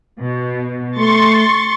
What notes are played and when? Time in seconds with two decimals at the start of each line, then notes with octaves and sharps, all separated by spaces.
0.20 B2
0.98 A3 C6 C#6 A6